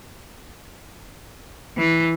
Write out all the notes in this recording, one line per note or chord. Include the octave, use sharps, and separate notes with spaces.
E3